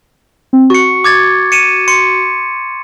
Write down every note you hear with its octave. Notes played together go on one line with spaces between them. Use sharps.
C4
F#4 C#6 C#7
D6 G#6 A6
C#7 D#7 E7
C6 C#7